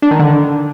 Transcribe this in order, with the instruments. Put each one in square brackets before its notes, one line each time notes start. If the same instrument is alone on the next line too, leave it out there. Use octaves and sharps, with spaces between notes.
[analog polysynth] D4
D#3
D3